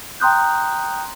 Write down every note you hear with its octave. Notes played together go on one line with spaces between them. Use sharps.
G5 A#5 C6 D#6 F#6 G6